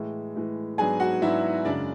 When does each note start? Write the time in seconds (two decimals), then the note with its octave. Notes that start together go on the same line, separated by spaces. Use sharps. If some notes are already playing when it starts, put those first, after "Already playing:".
Already playing: A2 E3 G#3
0.36 A2 E3 G#3
0.78 G#2 F#3 B3 D4 G#4 G#5
1.00 F#4 F#5
1.22 G#2 F#3 B3 D4 E4 E5
1.65 F#2 C#3 G#3 D4 D5